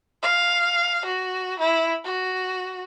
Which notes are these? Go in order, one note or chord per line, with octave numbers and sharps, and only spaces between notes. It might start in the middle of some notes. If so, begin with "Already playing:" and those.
F5
F#4
E4
F#4